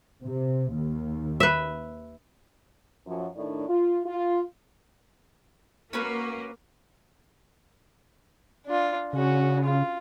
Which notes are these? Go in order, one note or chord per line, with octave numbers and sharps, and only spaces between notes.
C3
D#2
B4 E5
F#2 F3
A2 D#3 D4
F4
F4
A#3 C#4 F#4 B4
D4 F4
C#3 C#4 F#4
F4